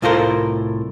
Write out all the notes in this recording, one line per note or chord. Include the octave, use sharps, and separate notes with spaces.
C2 A2 F4 A4 A#4 C5